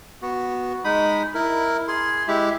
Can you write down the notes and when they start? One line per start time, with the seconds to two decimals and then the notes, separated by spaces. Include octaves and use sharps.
0.22 B3 F#4
0.84 G#3 D#4 B5 D#6
1.34 E4 A#4
1.88 G#4 C6
2.28 G#3 E4 G4 E5